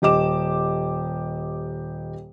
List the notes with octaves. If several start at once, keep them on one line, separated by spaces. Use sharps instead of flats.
D#1 G4 D#5 D6 E7